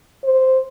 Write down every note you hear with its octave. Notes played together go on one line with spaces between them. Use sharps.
C5